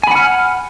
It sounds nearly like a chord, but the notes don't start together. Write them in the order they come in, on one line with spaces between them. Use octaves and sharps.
G#5 B5 F#5 F6